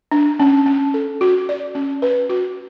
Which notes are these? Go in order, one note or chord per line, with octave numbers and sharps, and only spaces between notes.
D4
C#4
C#4
A4
F#4
D5
C#4
B4
F#4